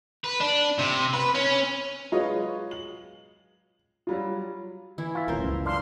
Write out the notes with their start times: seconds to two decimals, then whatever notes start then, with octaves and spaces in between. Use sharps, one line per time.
0.24 B4
0.41 D4
0.79 C3
1.13 B4
1.34 C#4
2.12 F#3 G#3 F4 B4 C#5 D#5
2.71 F#7
4.07 F#3 G3 F4
4.98 E3 E4
5.15 F4 E5
5.28 D#1 A1 C#4 A#4 C5
5.44 C#2 F#2
5.66 D4 F5 C6 F6